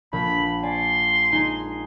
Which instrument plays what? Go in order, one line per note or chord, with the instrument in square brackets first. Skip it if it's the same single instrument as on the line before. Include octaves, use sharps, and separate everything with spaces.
[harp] A#1 [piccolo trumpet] B5
[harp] D5 G#5 [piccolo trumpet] C6
[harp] G#3 D#4 G#5